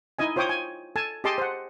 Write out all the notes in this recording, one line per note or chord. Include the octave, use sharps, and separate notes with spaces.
D#4 E4 D#5 G#5
F4 C5 C#5 G5 D6 D#6
G#5
A4 G#5 A5
G4 G#4 D#5 A5 C6 D6
C5 F#5